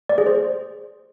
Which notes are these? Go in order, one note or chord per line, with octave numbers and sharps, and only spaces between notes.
D5
G#4
C5